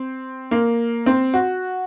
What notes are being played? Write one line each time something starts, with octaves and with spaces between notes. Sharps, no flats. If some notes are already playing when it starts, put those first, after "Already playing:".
Already playing: C4
A#3
C4
F#4